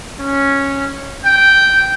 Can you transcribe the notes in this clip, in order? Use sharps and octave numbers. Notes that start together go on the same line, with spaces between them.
C#4
G5